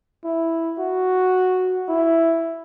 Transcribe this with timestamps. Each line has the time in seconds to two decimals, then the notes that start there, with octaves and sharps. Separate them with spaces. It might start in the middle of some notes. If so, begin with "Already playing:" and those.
0.24 E4
0.79 F#4
1.88 E4